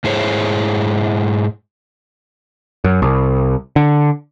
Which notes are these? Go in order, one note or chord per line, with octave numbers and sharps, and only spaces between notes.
G#2 E4 G#4 C5 C#5
F#2
C2
D3